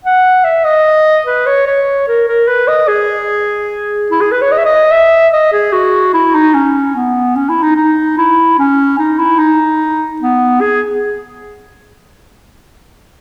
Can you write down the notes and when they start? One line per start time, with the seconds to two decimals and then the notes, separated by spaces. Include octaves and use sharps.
0.05 F#5
0.44 E5
0.65 D#5
1.26 B4
1.46 C#5
1.67 C#5
2.08 A#4
2.28 A#4
2.48 B4
2.68 D#5
2.88 G#4
4.11 E4
4.21 G#4
4.32 B4
4.41 C#5
4.52 D#5
4.58 E5
4.66 D#5
4.92 E5
5.33 D#5
5.53 G#4
5.73 F#4
6.14 E4
6.35 D#4
6.54 C#4
6.96 B3
7.36 C#4
7.49 E4
7.63 D#4
7.76 D#4
8.18 E4
8.59 C#4
8.98 D#4
9.19 E4
9.39 D#4
10.21 B3
10.61 G#4